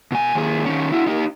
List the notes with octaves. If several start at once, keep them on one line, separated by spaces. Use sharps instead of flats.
B2 G#5
D#2 G#4
D#3 C#4
E4 F#4
D#4 G4